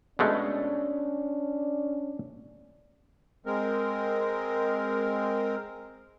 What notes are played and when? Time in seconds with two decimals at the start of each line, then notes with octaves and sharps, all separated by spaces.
0.19 B2 G#3 A3 C#4 D4
3.46 G#3 C4 A#4